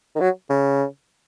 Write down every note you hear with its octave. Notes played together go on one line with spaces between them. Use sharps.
D#3
F#3
C#3